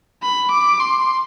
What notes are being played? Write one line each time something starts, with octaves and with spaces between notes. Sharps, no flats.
B5
D6
C6